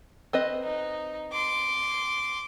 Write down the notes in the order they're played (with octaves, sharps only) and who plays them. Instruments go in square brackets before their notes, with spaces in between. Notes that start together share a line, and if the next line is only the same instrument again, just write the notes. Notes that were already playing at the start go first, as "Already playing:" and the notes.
[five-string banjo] C4 B4 D#5
[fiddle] D#4
C6 D6